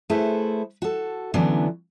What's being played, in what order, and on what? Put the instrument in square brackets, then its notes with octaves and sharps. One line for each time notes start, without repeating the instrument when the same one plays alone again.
[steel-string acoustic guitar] A3 E4 G#4 A4 B4 C5
F#4 A4
D3 E3 F#3 B3 C#4 D4